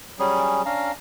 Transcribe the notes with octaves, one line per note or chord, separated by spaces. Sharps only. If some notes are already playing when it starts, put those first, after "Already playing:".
F#3 G3 C#4 G#4
C#4 D4 F5 A#5